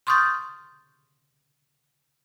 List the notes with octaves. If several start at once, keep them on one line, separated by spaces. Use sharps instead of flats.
C6 C#6 D#6 F6 G6 A6